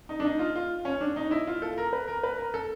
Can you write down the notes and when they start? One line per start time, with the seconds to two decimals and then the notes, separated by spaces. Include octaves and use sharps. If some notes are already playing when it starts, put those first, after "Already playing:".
0.09 D#4
0.20 D4
0.25 D#4
0.39 F4
0.56 F4
0.85 C#4
1.01 D4
1.16 D#4
1.31 E4
1.47 F4
1.62 A4
1.78 A#4
1.93 B4
2.08 A#4
2.23 B4
2.38 A#4
2.54 A4